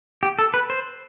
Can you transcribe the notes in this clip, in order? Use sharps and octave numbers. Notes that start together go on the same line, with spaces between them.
G4
A4
B4
C5